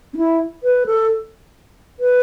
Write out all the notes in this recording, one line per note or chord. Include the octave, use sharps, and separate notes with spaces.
C#4
E4
B4
A4
B4